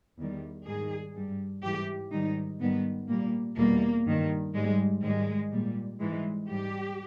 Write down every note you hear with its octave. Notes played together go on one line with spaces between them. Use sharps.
E2 D#3 G3
G#2 D#3 G3 G#4
G2 G3
G#2 E3 G3 G4
G#2 D#3 G3 D#4
G#2 D#3 G3 B3
A#2 G3 A#3
E2 B2 G3 A#3
G2 D#3 G3
G#2 G3 G#3
G#2 D#3 G3 G#3
A#2 G3
G#2 E3 G3 G#3
G#2 G3 G4